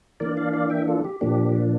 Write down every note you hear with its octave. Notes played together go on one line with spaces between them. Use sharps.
E3 A#3 D4 A#4 D5
D5 F5
D5 F5
E5 G5
F4 A4
G4
A#2 F3 A#3 D4 G4